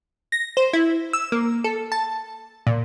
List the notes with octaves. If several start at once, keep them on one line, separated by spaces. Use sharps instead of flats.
A#6
C5
E4
E6
A#3
A4
A5
A#2